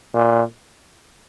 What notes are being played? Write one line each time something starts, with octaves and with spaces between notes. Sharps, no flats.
A#2